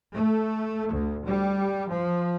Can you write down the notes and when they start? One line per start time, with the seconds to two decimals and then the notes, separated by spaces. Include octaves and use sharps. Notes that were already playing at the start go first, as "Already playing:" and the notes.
0.14 A3
0.93 D2
1.26 G3
1.90 F3